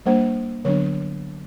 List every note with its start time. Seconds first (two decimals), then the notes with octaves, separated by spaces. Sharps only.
0.06 G3 A#3 D4 C5
0.65 D3 F#3 B3 D4 C#5